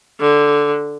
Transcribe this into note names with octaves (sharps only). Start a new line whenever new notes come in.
D3